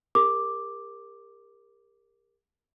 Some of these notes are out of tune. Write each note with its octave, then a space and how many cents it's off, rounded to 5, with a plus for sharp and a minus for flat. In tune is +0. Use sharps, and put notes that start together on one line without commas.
G4 +40 A#4 +0 D6 +0